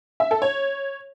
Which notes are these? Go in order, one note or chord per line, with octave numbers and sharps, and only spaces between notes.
E5
A4
C#5